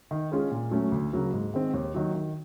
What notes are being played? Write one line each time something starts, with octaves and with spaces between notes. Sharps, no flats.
D#3
G#3 C#4 F4 G#4
A#2
F#3 A3 C#4
D2
C#3 F#3 A#3
G#2
D#3 G#3 C4
D#2
D#3 F#3
D#3